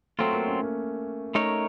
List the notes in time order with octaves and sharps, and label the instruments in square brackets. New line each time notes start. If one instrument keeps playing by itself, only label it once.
[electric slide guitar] F#3 C4 F4 [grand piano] A3
[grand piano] A#3
C#4
A#3
[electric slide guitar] A3 D#4 A#4 C#5